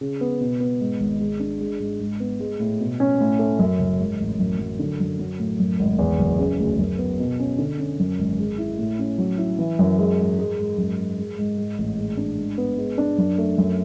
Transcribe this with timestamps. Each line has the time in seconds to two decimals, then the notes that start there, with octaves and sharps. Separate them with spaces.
0.01 C#3
0.21 B3
0.40 B2
0.60 B3
0.81 G#2
1.00 G#1
1.21 G#3
1.40 D4
1.61 G#3
1.80 G#2
2.00 G#2
2.20 B3
2.40 G#3
2.60 A2
2.80 B2
3.00 C#4
3.20 A2
3.39 A3
3.59 F#2
3.79 F#1
4.00 G#2
4.20 A1
4.40 F#2
4.59 F#3
4.79 D3
5.00 F#2
5.19 F#3
5.39 A2
5.59 F#2
5.79 G#1
5.99 E2
6.19 F#1
6.39 C#3
6.59 D2
6.79 F#2
6.98 B3
7.19 B2
7.39 C#4
7.58 D3
7.78 C#4
7.99 F#2
8.19 G#1
8.39 G#3
8.58 E4
8.78 A2
8.99 C#4
9.18 F#3
9.38 E4
9.59 E3
9.79 F#2
9.99 G#3
10.19 G#2
10.39 G#3
10.58 G#2
10.78 F#2
10.99 G#3
11.19 G#3
11.38 G#2
11.58 G#2
11.78 A1
11.98 G#3
12.17 D4
12.38 G#2
12.58 B3
12.78 G#3
12.98 D4
13.18 F#2
13.38 A3
13.58 F#2